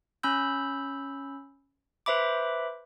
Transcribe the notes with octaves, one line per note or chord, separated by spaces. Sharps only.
C#4 B5 E6 G6
B4 C5 E5 B5 D6